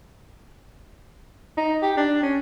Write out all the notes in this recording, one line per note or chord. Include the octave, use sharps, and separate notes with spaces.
D#4
G4
D4
C#4